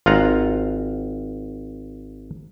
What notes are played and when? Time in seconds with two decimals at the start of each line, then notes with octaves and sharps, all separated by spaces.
0.06 G#1 F4 F5 F#5 A#5